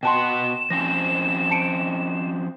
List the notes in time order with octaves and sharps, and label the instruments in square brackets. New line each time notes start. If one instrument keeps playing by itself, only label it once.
[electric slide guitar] B2 F#4 F#5 [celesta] G5 A5 C6 [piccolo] E7
[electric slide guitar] F3 C4 C#4 [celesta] A#6
[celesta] A5 C#7 D7